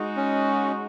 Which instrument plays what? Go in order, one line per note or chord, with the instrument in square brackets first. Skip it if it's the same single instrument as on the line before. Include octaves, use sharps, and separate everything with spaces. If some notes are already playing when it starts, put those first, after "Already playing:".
Already playing: [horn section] G#3 D#4 F#4
[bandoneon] C#4